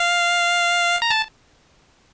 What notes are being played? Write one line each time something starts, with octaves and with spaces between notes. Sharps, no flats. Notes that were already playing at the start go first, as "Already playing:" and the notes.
Already playing: F5
A#5
A5